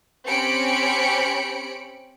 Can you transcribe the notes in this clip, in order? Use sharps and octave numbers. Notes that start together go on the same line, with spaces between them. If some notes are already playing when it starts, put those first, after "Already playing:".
C4 C#4 G4 B5 C#7 D7